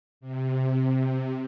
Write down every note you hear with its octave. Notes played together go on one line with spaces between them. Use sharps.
C3